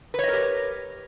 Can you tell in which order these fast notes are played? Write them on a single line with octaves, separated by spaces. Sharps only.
B4 C#5 D#5 A#4 G4